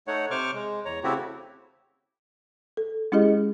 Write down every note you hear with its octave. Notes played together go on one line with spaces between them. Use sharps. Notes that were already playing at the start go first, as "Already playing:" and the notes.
A3 D#4 C#5 F#5
C3 C5 C#6 D6 F6
G#3
E2 C#5 A#5
C#3 A3 C4 E4 F#4 G4
A4
G#3 C#4 E4 G4 G#4 D#5